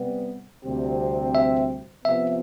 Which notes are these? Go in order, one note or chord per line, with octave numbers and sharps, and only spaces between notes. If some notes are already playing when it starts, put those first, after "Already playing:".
Already playing: C3 G3 B3
D2 C3 G3 C4 G4
E5
C3 F3 B3 E5